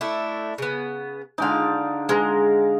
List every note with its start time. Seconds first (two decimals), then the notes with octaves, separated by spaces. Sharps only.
0.01 A3 D4 E4
0.58 C#3 B3
1.38 D3 G#3 D#4 D5 F5
2.09 G#3 G#4 F5 A#5